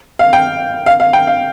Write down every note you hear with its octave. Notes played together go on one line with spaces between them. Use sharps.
F5
G5
F5
F5
G5
F5